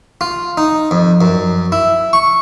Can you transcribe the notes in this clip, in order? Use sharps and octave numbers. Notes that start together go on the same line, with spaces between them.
F4
D#4
F2
F#2
E4
C#6